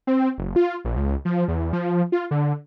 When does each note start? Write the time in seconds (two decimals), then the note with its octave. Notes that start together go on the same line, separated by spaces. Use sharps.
0.07 C4
0.38 F#1
0.56 F4
0.85 A#1
0.97 C#2
1.25 F3
1.48 E2
1.73 F3
2.12 F4
2.31 D3